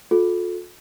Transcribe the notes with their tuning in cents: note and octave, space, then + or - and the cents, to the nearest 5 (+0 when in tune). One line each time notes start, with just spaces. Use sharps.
F4 +40 A4 -15